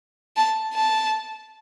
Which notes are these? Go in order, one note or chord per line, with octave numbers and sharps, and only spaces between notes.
A5
A5